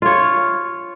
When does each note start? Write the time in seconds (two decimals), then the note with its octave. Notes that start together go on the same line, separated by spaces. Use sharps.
0.02 F4 C#5